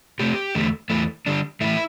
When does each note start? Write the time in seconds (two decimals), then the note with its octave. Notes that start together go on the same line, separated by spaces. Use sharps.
0.19 C3 A3 C4 G4
0.55 E2 D3 A3
0.90 E2 E3 A3
1.26 D3 G3 D4
1.61 A2 E3 A3 E4